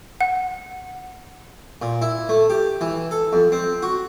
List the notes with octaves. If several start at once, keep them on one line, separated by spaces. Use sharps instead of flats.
F#5
A#2
E4
A3
G4
E3
A4
F2
C4
F#4